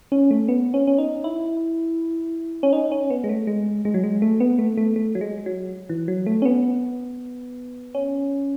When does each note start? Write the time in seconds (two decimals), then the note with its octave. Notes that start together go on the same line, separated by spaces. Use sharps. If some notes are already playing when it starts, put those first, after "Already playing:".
0.12 C#4
0.31 A3
0.48 B3
0.74 C#4
0.87 C#4
0.98 D#4
1.24 E4
2.63 C#4
2.73 D#4
2.92 C#4
3.10 B3
3.24 G#3
3.29 A3
3.47 G#3
3.85 G#3
3.94 F#3
4.04 G#3
4.22 A3
4.40 B3
4.59 A3
4.77 A3
4.96 A3
5.15 F#3
5.21 G#3
5.46 F#3
5.89 E3
6.08 F#3
6.27 A3
6.42 C#4
6.45 B3
7.95 C#4